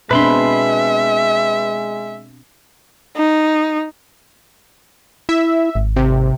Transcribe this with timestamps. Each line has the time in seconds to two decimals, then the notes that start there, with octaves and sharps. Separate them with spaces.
0.11 B2 G#3 C4 D4 B4 E5 B5 C6
3.17 D#4
5.29 E4 E5
5.75 G#1
5.96 C3